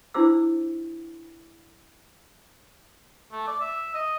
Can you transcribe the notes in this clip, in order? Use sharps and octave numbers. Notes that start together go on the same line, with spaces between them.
D4 E4 F4 C5 D6 E6
A3
D5
E5
D#5